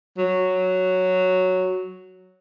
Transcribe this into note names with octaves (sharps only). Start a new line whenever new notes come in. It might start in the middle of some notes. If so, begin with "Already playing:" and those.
F#3